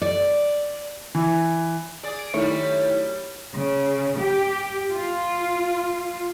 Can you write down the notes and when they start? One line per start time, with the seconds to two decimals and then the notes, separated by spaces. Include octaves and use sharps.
0.02 D5
1.15 E3
2.03 G#4 D5
2.19 D7
2.34 F#2 D#3 F#3 G3 A3 E4 C#5
3.55 C#3
4.20 G4
4.94 F4